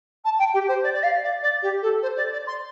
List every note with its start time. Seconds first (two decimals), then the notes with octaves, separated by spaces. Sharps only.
0.24 A5
0.39 G5
0.54 G4
0.68 C5
0.83 D5
0.93 D5
1.03 F5
1.23 D5
1.42 D5
1.62 G4
1.82 A4
2.02 C5
2.16 D5
2.32 D5
2.47 C6